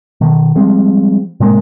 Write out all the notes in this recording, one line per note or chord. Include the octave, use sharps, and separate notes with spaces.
B2 D#3
F3 G3 G#3 C4
A2 C3 G#3 A#3